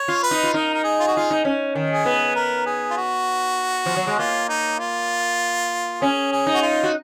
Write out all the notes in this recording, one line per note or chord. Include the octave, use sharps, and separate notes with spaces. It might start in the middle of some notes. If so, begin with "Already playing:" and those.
Already playing: C#5
F4
B4
D#4
F4
D#4 A#4
A#4
G#4
F4
F#4
F4 G#4
D#4
C#4
D#3
G#4
B3
A#4
G#4
F4
F#4
F3
F#3
G#3
A#3 F4
D#4
F4
C#4 G#4
G#4
D#4
F#4
F4
F#4